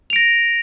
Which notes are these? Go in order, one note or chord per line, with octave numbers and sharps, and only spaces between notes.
A#6 D7 F7